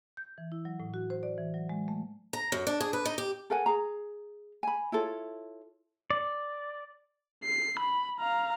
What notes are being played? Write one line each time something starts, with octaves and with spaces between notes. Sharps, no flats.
G6
E3
E4
F#3
A2
F#4
C5
D5
E3
F#3
G#3
A3
A#5
F#2
D4
G#4
B4
D#4
G4
A4 A#4 F#5 G#5
G#4 A#5
G#5 B5
E4 F4 A4 C#5
D5
C7
B5
F5 A#5